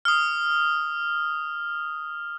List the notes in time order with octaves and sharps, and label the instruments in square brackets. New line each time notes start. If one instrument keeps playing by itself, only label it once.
[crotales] D#6 F6